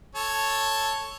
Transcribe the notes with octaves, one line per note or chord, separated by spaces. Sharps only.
A4 C#5